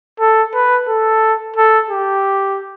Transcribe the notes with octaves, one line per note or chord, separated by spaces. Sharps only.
A4
B4
A4
A4
G4